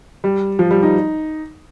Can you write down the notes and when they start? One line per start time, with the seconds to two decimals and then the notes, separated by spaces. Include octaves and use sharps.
0.24 G3
0.59 F3
0.71 G3
0.83 D#4